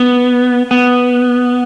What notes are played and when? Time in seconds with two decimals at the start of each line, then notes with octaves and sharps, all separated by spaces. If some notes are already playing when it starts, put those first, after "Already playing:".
Already playing: B3
0.71 B3